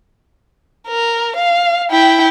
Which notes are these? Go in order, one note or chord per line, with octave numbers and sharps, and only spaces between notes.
A#4
F5
E4 G5